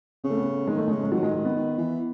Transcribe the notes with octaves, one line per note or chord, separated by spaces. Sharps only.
C#3 B3
A3
B3
D#3 G#3
A3
C#3 G#3
G#3
D#3 F#3
G#3
G#3
B3
D#3
E3